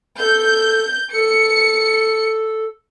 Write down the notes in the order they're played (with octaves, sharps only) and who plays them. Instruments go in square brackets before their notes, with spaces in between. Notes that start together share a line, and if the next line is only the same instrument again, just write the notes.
[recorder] A4 [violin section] G6
[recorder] A4 [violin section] C#7